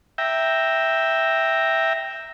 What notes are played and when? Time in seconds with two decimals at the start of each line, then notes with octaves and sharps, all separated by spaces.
0.18 E5 G5 A#5